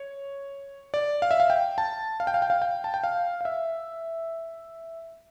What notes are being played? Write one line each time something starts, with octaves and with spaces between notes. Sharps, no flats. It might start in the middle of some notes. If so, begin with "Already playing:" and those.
Already playing: C#5
D5
F5
E5
F5
G5
A5
F5
G5
F5
G5
F5
G5
A5
G5
F5
F5
E5